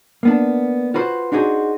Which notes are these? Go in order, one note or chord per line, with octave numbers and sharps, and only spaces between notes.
A#3 B3 D4
F4 F#4 B4 C5
D4 D#4 F#4 G#4 C5